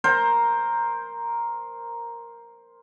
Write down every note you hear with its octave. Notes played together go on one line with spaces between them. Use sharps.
A#4 C5